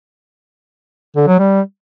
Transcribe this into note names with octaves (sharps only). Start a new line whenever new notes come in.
D3
F#3
G3